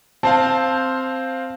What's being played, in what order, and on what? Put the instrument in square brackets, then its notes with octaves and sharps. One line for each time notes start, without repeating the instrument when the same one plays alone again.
[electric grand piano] C4 C5 F5 [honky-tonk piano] A5